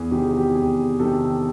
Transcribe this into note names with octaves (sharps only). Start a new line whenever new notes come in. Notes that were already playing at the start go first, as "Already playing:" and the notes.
Already playing: E2 G#4
C3 D#3 G4
G#4
G4
E2 G#4
C3 D#3 G4 A4